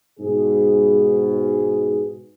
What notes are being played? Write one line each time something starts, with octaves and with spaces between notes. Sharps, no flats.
G#2 B2 G#4